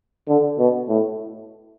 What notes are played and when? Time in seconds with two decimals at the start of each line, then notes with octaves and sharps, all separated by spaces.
0.28 D3
0.58 B2
0.88 A2